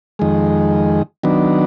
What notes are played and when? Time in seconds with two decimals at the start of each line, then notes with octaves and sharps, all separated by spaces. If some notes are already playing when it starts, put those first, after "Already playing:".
0.19 F2 D#3 G#3
1.23 D#3 F#3 B3 D4